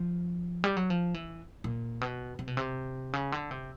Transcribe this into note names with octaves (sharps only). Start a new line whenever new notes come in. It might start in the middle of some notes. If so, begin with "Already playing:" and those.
Already playing: F3
G3
F#3
F3
E3
A#2
B2
C3
B2
C3
C#3
D3
C3